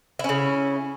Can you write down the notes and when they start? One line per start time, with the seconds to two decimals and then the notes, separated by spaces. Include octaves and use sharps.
0.19 E4
0.24 C#4
0.29 C#3